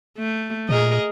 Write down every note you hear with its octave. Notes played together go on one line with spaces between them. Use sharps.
A3
A#2 G#4 A#4 D#5